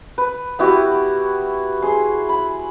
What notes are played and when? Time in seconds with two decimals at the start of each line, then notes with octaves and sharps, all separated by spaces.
0.18 B4
0.59 B3 E4 F#4 G4
1.82 G#4 C6
2.29 B5